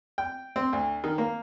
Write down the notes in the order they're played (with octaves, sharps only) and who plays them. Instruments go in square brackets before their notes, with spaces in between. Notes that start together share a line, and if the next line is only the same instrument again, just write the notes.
[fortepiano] G5
C4
D2
D#3
A#3